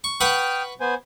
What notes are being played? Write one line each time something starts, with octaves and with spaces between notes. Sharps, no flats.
C#6
B4 F#5 G5 C#6 D#6 F6
B3 C5 G#5